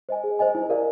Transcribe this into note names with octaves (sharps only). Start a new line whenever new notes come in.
C5 D#5 G#5
G#4
C5 D#5 G#5
E4
G4 A#4 D5 F5